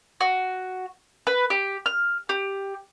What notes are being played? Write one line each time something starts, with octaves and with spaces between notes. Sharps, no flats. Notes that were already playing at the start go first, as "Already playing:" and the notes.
F#4
B4
G4
F6
G4